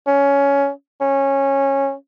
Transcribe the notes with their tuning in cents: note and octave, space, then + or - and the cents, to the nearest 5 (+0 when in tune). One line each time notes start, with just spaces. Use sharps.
C#4 +15
C#4 -15